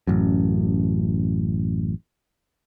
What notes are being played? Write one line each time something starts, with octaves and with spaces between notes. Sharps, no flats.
A1 F#2